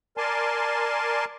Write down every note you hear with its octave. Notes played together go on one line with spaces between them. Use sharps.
A#4 D5 G#5 A5 C6